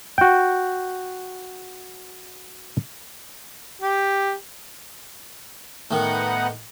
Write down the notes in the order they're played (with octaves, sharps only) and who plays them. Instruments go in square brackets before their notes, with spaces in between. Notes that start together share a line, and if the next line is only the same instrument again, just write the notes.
[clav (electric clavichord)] F#4 G5
[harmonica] G4
[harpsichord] A2 D#3 [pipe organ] B3 D#4 F#5